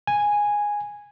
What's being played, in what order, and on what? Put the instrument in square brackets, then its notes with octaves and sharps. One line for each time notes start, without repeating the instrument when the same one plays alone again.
[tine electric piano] G#5